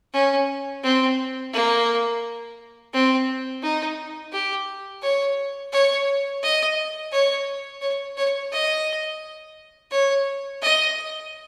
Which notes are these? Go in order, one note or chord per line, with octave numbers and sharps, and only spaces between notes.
C#4
C4
A#3
C4
D#4
G4
C#5
C#5
D#5
C#5
C#5
C#5
D#5
C#5
D#5